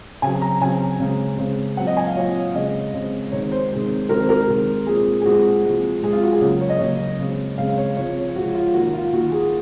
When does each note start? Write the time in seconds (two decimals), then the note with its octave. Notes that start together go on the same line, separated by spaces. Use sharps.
0.22 C#3 F#3 C4 G#5
0.42 A#5
0.61 C#3 F#3 C4 G#5
1.00 C#3 G#3 C4
1.38 C#3 G#3 C4
1.77 A#2 F#3 C4 F#5
1.87 D#5
1.97 G#5
2.06 F5
2.16 A#2 F#3 C4 C#5
2.55 C#3 G#3 C4 D#5
2.94 C#3 G#3 C4
3.32 C3 D#3 G#3 C4 C#5
3.52 C5
3.71 C3 D#3 G#3 C4
4.09 C3 D#3 G#3 C4 A#4
4.20 C5
4.29 A#4
4.48 C3 D#3 G#3 C4
4.87 A#2 G#3 C4 G#4
5.22 G#4
5.25 A#2 G#3 C4 F#4
5.65 C3 F3 G#3 C4
6.03 C3 F3 G#3 C4 G#4
6.13 F4
6.23 F#4
6.32 G#4
6.41 C#3 F#3 A#3
6.61 C#5
6.70 D#5
6.79 C#3 F#3 A#3 C#5
7.20 C#3 G#3 C4
7.58 C#3 G#3 C4 F5
7.78 C#5
7.97 C3 F3 G#3 C4 C#5
8.35 C3 F3 G#3 C4 F#4
8.55 F4
8.74 D#3 A#3 F#4
8.93 F4
9.13 D#3 A#3 F#4
9.32 G#4